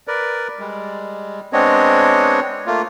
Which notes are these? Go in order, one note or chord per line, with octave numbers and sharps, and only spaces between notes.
A#4 B4 D5
G3 G#3
G#3 B3 C4 D4 C#5 D#5
A3 A#3 F4